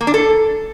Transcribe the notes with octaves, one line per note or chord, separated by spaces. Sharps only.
A#3
D4
A4